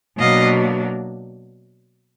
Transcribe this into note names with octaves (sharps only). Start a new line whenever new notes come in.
B2 F#3 A#3 D4 D#5 F5